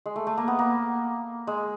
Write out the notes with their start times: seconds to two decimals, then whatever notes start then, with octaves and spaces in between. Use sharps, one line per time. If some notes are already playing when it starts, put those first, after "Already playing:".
0.06 G#3
0.16 A3
0.27 A3
0.38 A#3
0.48 B3
0.59 A#3
1.47 G#3